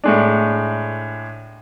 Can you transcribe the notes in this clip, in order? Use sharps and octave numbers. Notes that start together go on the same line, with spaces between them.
A2 G#3 D4